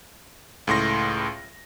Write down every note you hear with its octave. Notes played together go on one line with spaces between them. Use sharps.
C#2 A2 C6 A#6